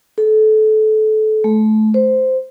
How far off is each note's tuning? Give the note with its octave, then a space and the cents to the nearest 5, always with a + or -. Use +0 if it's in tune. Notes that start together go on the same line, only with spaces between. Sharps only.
A4 -25
A3 -25
C5 -10